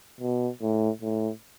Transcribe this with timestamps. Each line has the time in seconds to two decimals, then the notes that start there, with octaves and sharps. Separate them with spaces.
0.20 B2
0.61 A2
1.02 A2